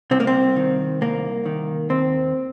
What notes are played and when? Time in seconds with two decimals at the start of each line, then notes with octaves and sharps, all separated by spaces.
0.11 C2 C4
0.20 A#3
0.27 C4
0.56 D#3
1.01 C2 A#3
1.46 D#3
1.90 D#2 C4